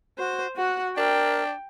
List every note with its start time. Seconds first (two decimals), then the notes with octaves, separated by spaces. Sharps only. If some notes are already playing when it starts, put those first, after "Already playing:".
0.18 F#4 C5
0.56 F#4 F#5
0.97 D4 A#4 G5